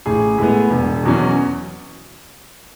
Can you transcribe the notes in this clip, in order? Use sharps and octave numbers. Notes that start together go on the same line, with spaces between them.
A1 G#4
A2 G#3 B3
E1
E2 B2 F#3 C#4